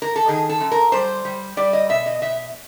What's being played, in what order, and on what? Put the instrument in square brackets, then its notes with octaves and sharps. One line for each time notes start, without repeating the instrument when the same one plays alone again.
[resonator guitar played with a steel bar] A#4
A4
D#3 G#4
A4
F#2
A#4
G3 C5
G3
G3 D5
D#5
B2 E5
D#5
B2 E5